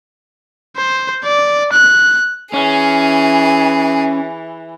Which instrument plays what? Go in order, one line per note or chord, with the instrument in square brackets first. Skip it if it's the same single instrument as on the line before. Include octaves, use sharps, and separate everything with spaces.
[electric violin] C5
D5
F#6
[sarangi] E3 [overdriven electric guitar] C#4 [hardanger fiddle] G#4